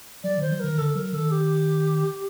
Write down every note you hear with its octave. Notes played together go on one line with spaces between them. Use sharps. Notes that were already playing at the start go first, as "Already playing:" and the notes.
F#3 D5
D#3 C5
F#3
D#3 A#4
D3 A4
F#3 A#4
D#3 A4
G4